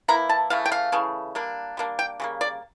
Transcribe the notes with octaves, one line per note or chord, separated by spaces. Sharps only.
E3 A#3 E4 A#5
A5
C#3 E3 A3 F5
G5
F5
C#3 E3 A3
G3 A#3 D4
G3 A#3 D4
G5
C#3 G3 A#3
D5